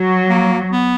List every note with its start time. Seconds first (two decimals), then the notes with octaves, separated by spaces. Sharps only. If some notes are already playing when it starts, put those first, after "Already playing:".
Already playing: F#3
0.29 A#3
0.71 B3